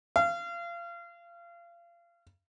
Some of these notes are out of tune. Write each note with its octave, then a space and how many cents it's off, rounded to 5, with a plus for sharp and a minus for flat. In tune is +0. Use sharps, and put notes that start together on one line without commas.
F5 -30